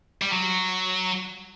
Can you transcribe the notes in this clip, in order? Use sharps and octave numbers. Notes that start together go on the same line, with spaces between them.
G3
F#3